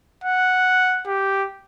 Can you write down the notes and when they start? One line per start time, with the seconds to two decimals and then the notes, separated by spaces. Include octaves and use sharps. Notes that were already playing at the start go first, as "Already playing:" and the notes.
0.24 F#5
1.07 G4